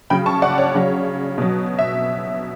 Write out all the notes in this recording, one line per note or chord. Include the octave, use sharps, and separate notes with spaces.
C#3 F#3 G5 B5
A5 C#6
D5 F#5
C#5
C#3 F#3
B2 F#3
E5